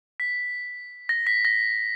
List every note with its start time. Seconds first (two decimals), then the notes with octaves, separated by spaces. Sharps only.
0.20 B6
1.09 A#6
1.27 B6
1.45 A#6